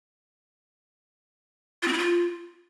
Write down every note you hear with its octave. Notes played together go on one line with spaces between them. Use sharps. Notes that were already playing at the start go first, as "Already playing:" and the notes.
F4
C4
E4
F4